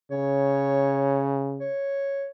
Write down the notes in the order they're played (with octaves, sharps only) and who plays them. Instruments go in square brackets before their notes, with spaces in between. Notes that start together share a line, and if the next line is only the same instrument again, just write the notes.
[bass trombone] C#3 [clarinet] C#5
[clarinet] C#5